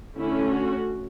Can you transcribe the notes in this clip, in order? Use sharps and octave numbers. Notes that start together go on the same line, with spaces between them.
D3 A3 C#4 E4
F#4